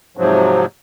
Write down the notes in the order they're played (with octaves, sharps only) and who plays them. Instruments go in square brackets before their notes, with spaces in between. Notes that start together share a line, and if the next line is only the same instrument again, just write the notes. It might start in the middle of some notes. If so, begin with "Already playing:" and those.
[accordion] G#2 C3 F3 F#3